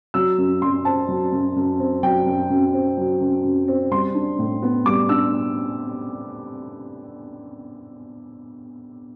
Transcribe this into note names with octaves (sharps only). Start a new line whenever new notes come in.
F#3 E6
F#2
F#2 C6
C4 A5
F#3
F#2
F#2
C4
F#3 G5
F#2
F#2
C4
F#3
F#2
F#2
C4
G3 C6
D4
A2
B3
G3 D6
D4 E6